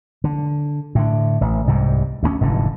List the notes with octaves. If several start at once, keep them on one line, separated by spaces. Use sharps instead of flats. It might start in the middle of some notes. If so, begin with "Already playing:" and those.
D3
A2 D3
A1
C2 G#2 C3
D2 G3 C#4
F1 G#2 D3 E3